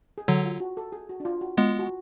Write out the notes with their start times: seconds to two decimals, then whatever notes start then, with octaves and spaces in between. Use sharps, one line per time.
0.18 G#4
0.28 D3 F#3 F#4
0.45 F4
0.61 F#4
0.77 A4
0.92 G#4
1.09 F#4
1.20 D4
1.25 F4
1.41 F#4
1.57 G#3 B3 F4
1.79 F#4